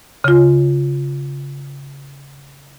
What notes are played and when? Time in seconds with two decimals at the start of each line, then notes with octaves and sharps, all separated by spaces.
0.24 C#3 F4